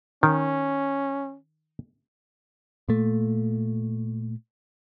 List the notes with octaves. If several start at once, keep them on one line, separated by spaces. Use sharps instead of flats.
D#3 C#4
A#2 A3